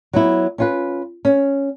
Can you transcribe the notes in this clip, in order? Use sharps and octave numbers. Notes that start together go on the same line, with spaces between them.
F#3 B3 E4
C#4 F4 B4
C#4